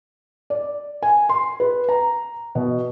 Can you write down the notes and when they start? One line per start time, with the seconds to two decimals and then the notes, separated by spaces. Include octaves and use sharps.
0.50 D5
1.02 G#5
1.29 C6
1.60 B4
1.89 A#5
2.55 B2